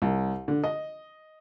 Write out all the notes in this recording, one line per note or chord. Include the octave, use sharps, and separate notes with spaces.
C2
D3
D#5